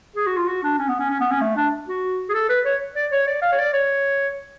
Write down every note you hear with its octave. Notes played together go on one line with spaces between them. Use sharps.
G#4
F#4
F4
F#4
D4
C#4
B3
C#4
C#4
B3
C#4
A3
D4
F#4
G#4
A4
B4
C#5
D5
C#5
D5
F5
C#5
D5
C#5